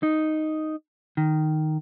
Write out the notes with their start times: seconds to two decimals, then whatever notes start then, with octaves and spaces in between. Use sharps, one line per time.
0.03 D#4
1.17 D#3